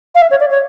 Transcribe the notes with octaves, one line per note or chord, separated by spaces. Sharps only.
F5
E5
C#5
D5
C#5